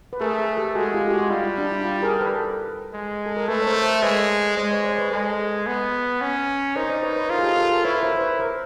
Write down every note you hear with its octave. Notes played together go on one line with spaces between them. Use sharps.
B4
A3 G#4 A#4
G#4 A#4
G4 A4
G#3 F#4 G#4
F4 G4
G4
F#4
G3 F4
E4
D4
E4
F4
G#4 A#4
A#4
A4 B4
G#3
A4
A#4
A3 A4 B4
C#5
A#4 C5
A#4 C5
G#3 B4 C#5
G#3 C5 D5
B4 C#5
C5 D5
B4 C#5
G#3 A4 B4
B3
C#4
D#4 A#4 C5
C5 D5
B4 C#5
B4 C#5
F4 A#4 C5
G#4
G4 A4
G4 A4
G#4 A#4
E4 B4 C#5
A#4 C5
C5
B4 C#5
A#4 C5